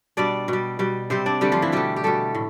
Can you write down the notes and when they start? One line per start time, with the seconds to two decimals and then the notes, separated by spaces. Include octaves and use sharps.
0.17 B2 G3 D4 D5
0.48 B2 G3
0.79 B2 G3
1.10 C3 G3 C4 C5
1.26 D4 D5
1.41 D3 G3 A3 G4
1.52 F3 F4
1.62 E3 E4
1.72 B2 G3 A3 G4
1.96 G4
2.04 B2 G3 A3 A4
2.35 A2